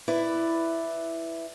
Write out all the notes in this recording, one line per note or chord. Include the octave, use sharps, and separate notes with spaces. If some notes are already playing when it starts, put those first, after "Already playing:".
E4 B4 D5